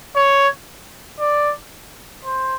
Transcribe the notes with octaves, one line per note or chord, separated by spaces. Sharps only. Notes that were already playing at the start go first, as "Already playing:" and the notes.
C#5
D5
C5